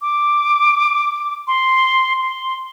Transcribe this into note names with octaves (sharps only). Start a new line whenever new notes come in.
D6
C6
C6